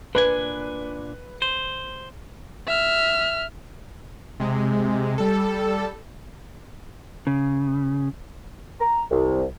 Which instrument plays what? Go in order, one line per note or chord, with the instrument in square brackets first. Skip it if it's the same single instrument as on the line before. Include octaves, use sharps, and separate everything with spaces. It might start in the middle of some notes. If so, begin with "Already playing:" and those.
[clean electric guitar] A#2 D4 G#5 [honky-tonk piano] B4
[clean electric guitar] C5
[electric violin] E5 F6
[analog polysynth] C3 G#3
G3 A4
[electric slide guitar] C#3
[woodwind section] A#5
C2